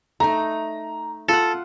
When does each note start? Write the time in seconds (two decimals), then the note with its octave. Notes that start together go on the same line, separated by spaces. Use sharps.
0.20 A3 D#4 A#5
1.29 F4 A4 F#5